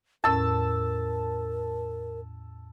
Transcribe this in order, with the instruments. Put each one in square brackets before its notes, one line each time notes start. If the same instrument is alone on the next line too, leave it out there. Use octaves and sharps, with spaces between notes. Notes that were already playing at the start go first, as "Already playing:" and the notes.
[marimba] E2 A2 C#4 [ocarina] A#4 [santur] A5 E6